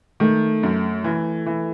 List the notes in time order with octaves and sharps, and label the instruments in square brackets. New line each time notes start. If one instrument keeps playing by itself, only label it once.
[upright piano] D#3 [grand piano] A3
[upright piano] F#2
E3
E3